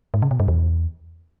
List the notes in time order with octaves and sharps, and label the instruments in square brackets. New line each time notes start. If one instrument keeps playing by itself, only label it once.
[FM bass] G#2
C#3
B2
G2
E2